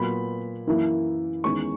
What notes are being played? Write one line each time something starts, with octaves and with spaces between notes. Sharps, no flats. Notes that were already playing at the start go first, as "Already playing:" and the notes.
Already playing: A#2 F#3 B3 B5
F#2 E3 A#3 E4
E2 D#3 G#3 C#4 C#6